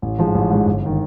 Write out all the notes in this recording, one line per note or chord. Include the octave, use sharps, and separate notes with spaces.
A1
G#2 F3 G#3
A1
G#2 F3 G#3
G1
D#3